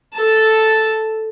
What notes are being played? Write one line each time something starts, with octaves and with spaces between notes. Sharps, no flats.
A4 A5